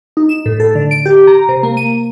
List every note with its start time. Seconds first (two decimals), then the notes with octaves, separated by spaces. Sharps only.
0.17 D#4
0.29 E7
0.46 A2
0.60 A4
0.75 D3
0.91 D7
1.06 G4
1.27 A#5
1.49 C3
1.63 A#3
1.77 D#7